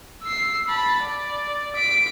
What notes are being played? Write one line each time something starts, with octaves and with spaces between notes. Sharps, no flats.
E6 C7
A5 B5
D5
B6 D7